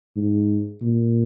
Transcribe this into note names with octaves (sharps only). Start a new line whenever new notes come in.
G#2
A#2